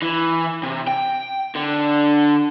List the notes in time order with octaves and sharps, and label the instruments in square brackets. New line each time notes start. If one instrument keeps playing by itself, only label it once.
[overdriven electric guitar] E3
C3
G5
D3